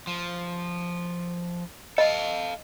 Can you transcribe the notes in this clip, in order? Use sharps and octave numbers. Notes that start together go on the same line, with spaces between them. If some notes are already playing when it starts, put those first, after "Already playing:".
F3
A4 D#5 F5